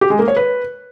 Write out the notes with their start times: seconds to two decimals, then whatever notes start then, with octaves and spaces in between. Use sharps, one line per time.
0.01 G4
0.10 G#3
0.19 A#3
0.28 C#5
0.37 B4